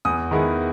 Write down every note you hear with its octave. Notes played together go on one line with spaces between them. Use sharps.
E2 D#6
D#3 G#3 B3 E4